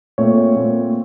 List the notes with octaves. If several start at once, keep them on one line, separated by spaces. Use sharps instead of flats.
A#2 A3 C4 C#5
A#2 A3 C4